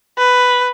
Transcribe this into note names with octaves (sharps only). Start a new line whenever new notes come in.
B4